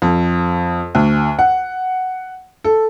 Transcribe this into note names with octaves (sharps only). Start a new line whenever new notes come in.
F2
D2
F#5
A4